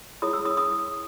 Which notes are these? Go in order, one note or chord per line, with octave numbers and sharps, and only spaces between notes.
E4 G#4 C#5 D#6
E6
D#6
D#6